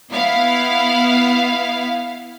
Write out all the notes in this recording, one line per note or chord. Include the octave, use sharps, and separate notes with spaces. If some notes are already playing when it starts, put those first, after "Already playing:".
B3 E4 F5